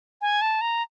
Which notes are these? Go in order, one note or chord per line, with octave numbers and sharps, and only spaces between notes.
G#5
A5
A#5